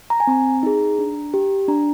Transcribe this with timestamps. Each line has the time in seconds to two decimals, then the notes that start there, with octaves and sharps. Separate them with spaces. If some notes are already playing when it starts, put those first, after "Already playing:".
0.10 A#5
0.20 G#5
0.27 C4 A#5
0.63 D#4 G#4
0.98 D4
1.34 G4
1.68 D4 A#5